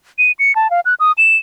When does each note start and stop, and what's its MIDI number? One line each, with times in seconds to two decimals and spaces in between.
0.18 0.32 99
0.39 0.55 97
0.56 0.70 81
0.71 0.80 77
0.85 0.94 90
1.00 1.12 87
1.18 1.37 100